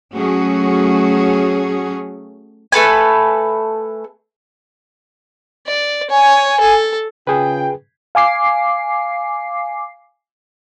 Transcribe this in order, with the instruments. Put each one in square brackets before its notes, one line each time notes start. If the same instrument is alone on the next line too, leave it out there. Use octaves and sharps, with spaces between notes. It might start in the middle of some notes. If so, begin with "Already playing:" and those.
[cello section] F#3 A3 C#4 F#4 G#4
[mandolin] A3 A4 B4 G#5
[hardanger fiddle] D5
[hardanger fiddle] C#5 [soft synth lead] G#5
[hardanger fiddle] A4
[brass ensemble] C#3 F4 G5 [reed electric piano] G#4 B4
[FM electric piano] F5 G#5 D6 C7